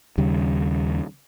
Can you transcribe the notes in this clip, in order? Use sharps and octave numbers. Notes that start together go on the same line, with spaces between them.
D#2 C#3 G3